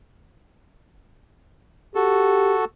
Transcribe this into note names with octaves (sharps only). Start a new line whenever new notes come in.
F#4 G4 A4